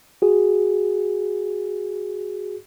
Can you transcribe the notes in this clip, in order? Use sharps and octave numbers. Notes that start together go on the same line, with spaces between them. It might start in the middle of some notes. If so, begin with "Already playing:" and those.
F#4 G#4